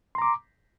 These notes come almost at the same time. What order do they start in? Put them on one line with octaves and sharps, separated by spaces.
C6 A#5 D6